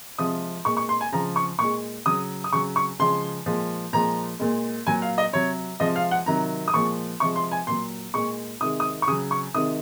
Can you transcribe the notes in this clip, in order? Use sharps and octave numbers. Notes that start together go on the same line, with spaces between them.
C3 F3 G#3 D#6
A#2 G#3 C#6
C#6
C6
G#5
C#3 F3 G#3 A#5
C#6
A#2 G#3 C#6
C#3 F#3 D#6
D#6
C#3 F#3 C#6
C#6
C#3 F3 G#3 C6
A#2 F3 G#3
A#2 F3 G#3 A#5
A#2 G#3
A#2 F#3 G#5
F5
D#5
C3 F#3 C#5
C3 F3 G#3 D#5
F5
F#5
C3 D#3 F#3 A#5
D#6
A#2 F3 G#3 C#6
C3 F3 G#3 C#6
C6
G#5
A#2 F#3 C6
A#2 G#3 C#6
C3 D#3 G#3 D#6
D#6
C#6
C#3 F#3 D#6
C#6
C3 D#3 G#3 D#6